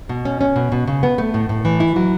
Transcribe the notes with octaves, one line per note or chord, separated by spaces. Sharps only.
B2
C#4
C#4
B2
B2
C#3
B3
A3
A2
A2
E3
E4
F#3